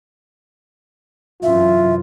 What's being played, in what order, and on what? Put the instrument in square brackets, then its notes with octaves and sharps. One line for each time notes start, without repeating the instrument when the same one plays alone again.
[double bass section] F#2 C3 E3 [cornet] F4 [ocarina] E5